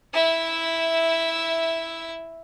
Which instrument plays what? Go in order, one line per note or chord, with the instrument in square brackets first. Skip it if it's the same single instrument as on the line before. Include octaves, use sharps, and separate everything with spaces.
[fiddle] E4 E5